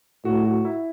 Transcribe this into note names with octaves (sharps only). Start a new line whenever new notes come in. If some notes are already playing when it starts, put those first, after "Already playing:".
A2 F#4
F#4
E4